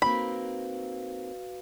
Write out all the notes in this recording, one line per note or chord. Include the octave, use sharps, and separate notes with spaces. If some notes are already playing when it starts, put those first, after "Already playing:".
A#3 C4 D#4 F#4 B4 F5 B5